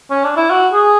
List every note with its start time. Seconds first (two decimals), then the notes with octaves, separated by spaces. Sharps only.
0.10 C#4
0.24 D4
0.37 E4
0.51 F#4
0.73 G#4